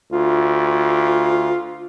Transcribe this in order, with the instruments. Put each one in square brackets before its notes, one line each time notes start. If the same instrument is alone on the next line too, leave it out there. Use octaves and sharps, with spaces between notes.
[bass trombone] D2 [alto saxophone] F4